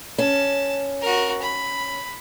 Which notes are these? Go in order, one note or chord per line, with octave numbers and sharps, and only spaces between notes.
C#4 A5
F#4 A#4
B5